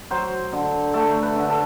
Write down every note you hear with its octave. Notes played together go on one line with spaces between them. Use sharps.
F#3 C5
D3
A3 A4
B4
D3
A4